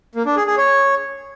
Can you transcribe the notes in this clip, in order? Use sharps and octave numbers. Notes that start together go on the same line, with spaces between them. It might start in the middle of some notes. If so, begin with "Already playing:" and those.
A#3
D4
G#4
G#4
C#5